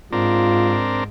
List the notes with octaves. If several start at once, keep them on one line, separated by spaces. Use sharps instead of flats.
G#2 C4 D4 F4 A#4